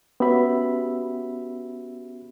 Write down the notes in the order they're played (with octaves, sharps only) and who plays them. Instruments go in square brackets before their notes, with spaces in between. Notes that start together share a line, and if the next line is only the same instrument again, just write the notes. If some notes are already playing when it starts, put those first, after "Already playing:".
[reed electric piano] B3 C#4 F#4 G4 E5 B5